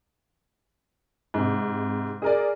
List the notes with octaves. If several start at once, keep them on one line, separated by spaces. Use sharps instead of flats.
G#2 C3
G#4 A#4 D5